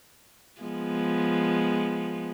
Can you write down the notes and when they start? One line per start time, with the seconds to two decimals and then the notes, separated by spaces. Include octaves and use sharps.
0.62 F3 G#3 B3